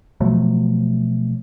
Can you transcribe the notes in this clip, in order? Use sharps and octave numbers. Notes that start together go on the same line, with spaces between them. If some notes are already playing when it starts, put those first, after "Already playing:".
B2 F3 F#3 A3